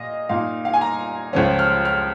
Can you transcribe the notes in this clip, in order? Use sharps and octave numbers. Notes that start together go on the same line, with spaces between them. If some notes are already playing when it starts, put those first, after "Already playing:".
Already playing: A#2 D#5 F5
A#2 A#3 D#4 F5
F5
G#5
A#5
C#2 C#3 F3 C#4
F6
F6